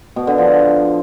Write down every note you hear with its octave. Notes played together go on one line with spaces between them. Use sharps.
B2
D3
F3